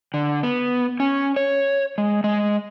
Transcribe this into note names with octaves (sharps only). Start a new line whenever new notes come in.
D3
B3
C#4
C#5
G#3
G#3